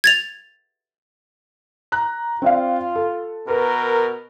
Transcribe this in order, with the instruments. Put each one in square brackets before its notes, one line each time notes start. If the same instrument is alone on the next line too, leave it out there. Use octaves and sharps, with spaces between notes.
[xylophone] G#6 A6 F7
[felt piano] A#5 F#6
[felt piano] C4 D5 F5 [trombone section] F4
[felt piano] A4
[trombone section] B2 A#4 [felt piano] B4